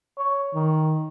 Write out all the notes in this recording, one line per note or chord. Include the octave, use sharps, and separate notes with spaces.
C#5
D#3